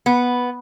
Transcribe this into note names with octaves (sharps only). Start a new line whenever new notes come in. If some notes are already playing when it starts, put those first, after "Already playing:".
B3